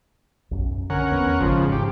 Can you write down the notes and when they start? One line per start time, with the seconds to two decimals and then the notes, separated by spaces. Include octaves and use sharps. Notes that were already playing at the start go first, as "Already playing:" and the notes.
0.51 B1 F#2
0.90 D3 C#4 A#4 F#5
1.12 E2 B3
1.40 G#1 G#2 C#3 F3
1.72 G4